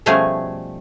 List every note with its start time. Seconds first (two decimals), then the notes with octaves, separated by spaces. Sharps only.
0.06 B2 F3 G3 A3 C#4 G#4